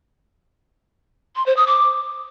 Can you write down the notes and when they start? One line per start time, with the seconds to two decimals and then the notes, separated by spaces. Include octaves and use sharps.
1.36 C6
1.46 C5
1.57 D#6
1.67 D6